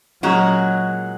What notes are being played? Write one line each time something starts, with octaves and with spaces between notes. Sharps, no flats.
A#2 F#3 G#3 C#4 F#4